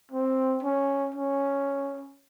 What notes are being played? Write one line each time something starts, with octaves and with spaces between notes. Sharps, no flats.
C4
C#4
C#4